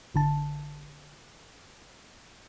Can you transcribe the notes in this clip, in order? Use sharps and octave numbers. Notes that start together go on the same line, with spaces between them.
G#1 D3 A5